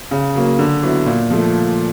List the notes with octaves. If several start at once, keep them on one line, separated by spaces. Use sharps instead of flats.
C#3
F#3 A#3
D3
F#3 B3 E4
A#2
F3 A3